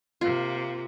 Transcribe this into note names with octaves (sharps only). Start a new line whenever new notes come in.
C3 A#3 F4